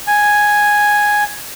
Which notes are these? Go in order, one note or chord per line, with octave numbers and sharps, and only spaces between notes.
G#5